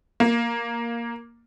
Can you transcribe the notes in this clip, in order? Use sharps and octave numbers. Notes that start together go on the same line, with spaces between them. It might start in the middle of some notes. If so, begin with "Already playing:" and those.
A#3